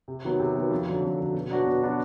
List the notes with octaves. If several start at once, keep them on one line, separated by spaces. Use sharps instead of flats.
C3
D#3 F#3 B3
C3
D#3 F#3 B3
F2
D3 F#3
F2
D3 F#3
B2
F#3 B3 D4 F#4
B2
F#3 B3 D4 F#4